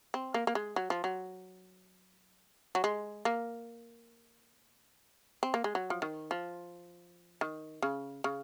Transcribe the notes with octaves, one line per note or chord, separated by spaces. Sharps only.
C4
A#3
A#3
G#3
F#3
F3
F#3
F#3
G#3
A#3
C4
A#3
G#3
F#3
F3
D#3
F3
D#3
C#3
C#3